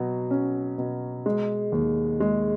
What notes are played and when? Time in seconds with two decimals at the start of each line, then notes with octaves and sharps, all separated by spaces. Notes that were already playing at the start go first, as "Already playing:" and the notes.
Already playing: B2 F#3
0.30 C#4
0.78 B2
1.26 G#3
1.72 D#2
2.20 G#3